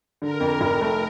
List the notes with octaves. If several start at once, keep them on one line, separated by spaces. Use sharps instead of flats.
D3 A#4
F2
F1
A3